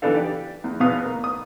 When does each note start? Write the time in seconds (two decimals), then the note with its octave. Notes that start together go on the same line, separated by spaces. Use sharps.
0.02 E3 B3 D4 A4 F5
0.14 G4 D5
0.64 E2
0.80 E2 B2 B3 B4 F5 D#6
1.05 A#3
1.24 D#6